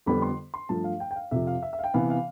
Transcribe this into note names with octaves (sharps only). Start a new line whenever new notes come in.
F2 D3 G3 B3 B5
C6
C6
G2 F3 A3 A5
F5
G5
G5
F5
F2 C3 F3 E5
F5
E5
E5
F5
G5
C3 E3 B3 F5
F5